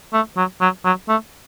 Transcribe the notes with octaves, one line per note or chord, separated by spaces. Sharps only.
A3
F#3
F#3
F#3
A3